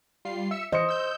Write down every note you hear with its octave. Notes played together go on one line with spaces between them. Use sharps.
G3 F4 C7
E5 E6 C#7
E3 C5 D#5 C#7
E6 G6